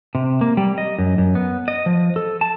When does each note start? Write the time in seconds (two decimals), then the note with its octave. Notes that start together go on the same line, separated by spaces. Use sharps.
0.15 C3
0.41 A#3
0.57 G3
0.78 D#5
0.99 F#2
1.18 F#2
1.35 B3
1.68 D#5
1.86 F3
2.16 A4
2.41 A5